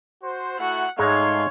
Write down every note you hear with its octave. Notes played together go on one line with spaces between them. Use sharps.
F#4 C5
A3 E4 F#4 F#5
G#2 G#3 A3 D#4 C#5 F5 C6